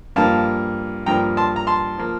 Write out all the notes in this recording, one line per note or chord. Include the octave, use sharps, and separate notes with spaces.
G2 F3 A#3 F5 A5
G2 F3 A#3 G5 A#5
A5 C6
A#5
A5 C6
F3 A#3